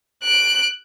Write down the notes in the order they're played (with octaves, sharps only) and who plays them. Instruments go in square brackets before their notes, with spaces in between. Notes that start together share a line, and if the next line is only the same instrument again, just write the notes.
[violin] F#6 D7